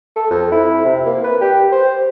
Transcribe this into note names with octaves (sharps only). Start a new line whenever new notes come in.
A4
F2
E4
C3
A#3
B4
G4
C5